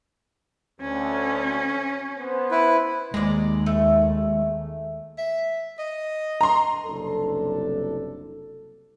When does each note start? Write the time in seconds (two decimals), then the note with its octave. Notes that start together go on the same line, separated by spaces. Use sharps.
0.81 D2 C#4
2.18 B3 C5
2.51 E4 B4
3.14 D#2 G#3 D5 A#5
3.66 A3
5.18 E5
5.79 D#5
6.41 A#5 C6
6.86 F#1 C2 C3 D4 A4